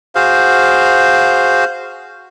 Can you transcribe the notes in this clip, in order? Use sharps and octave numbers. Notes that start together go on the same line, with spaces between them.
F#4 G#4 C5 F5